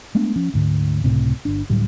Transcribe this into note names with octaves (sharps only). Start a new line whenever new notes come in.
G#3 A3 B3 D4
F3 C#4
D2 G#2 D3
C#2 A2 C3
G1 D4
D2 A2 F#3 G3